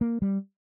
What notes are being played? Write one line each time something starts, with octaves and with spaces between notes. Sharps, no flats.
A#3
G3